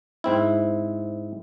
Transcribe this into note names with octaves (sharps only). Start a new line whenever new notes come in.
G#2 C4 E4